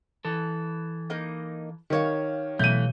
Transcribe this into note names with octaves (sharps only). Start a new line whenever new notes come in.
E3 A4
A#3 D#4 G6
D#3 G4 C#5 F5
B2 E3 F#3 A3 G6 D#7